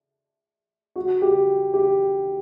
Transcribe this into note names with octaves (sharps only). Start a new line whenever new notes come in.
F#4
G4
G4